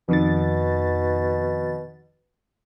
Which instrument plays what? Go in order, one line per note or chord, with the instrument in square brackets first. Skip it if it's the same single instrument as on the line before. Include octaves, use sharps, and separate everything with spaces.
[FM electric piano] F2 D#3 A6 [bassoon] B2